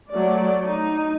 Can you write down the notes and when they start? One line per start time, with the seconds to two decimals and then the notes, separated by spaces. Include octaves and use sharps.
0.11 F#3 A3 D5
0.66 D#4